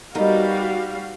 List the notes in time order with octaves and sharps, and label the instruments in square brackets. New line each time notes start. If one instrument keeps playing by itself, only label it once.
[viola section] G3 F#4 F5 [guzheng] B3 D#4 A#4